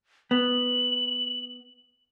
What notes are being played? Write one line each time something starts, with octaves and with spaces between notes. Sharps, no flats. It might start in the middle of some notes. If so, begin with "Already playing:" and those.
B3 F#7